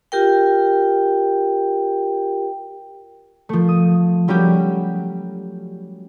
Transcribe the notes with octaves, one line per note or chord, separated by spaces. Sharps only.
F4 G4 A#4 G5
F3 A3
D#6
F#3 G3 C#4 F#4 G4